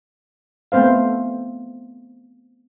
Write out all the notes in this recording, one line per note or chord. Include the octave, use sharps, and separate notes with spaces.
A3 B3 C4 C5 F5